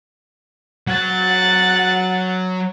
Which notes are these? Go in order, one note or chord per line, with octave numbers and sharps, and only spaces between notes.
F#3 F#5 A6